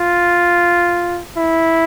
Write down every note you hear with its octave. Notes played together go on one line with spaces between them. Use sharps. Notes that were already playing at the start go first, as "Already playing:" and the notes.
Already playing: F4
E4